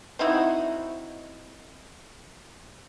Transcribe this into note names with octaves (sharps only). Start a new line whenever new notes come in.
C4 D#4 E4 F#4